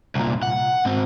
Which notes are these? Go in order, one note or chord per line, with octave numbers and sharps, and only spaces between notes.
C2 A#2
F#5
G#2 C4